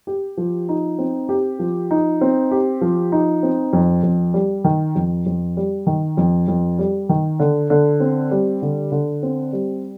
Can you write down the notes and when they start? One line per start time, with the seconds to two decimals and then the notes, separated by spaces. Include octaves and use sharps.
0.07 G4
0.37 F3
0.69 D#4
0.99 C4
1.29 G4
1.59 F3
1.91 D#4
2.21 C4
2.51 G4
2.81 F3
3.12 D#4
3.43 C4
3.73 F2
4.03 F2
4.34 G3
4.64 D#3
4.95 F2
5.26 F2
5.57 G3
5.87 D#3
6.17 F2
6.48 F2
6.79 G3
7.09 D#3
7.39 D3
7.70 D3
8.00 C4
8.31 G3
8.62 D3
8.92 D3
9.23 C4
9.53 G3